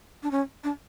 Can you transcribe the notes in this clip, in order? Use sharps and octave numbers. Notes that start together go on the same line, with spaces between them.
D4
C#4
D4